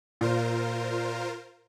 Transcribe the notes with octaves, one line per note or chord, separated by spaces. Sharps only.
A#2 F4 A#4 C5